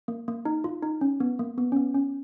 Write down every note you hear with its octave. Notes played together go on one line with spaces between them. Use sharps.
A#3
A#3
D#4
F4
D#4
C#4
B3
A#3
B3
C#4
B3
C#4